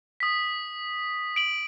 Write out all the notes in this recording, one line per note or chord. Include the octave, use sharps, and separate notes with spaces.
D#6 B6
D7 F#7